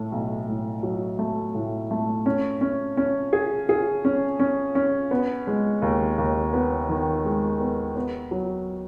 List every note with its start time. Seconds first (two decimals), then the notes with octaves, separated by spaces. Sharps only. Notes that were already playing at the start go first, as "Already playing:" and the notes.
Already playing: A2 A3
0.12 B1
0.48 A2
0.83 F#3
1.19 A3
1.55 A2
1.91 A3
2.26 C#4
2.61 C#4
2.97 C#4
3.33 G#4
3.69 G#4
4.05 C#4
4.40 C#4
4.75 C#4
5.11 B3
5.47 G#3
5.82 D#2
6.18 D#2
6.54 B3
6.89 D#3
7.25 G#3
7.60 B3
7.96 B3
8.31 F#3